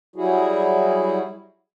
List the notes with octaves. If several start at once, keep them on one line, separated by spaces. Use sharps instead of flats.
F#3 G3 E4 F#4 G#4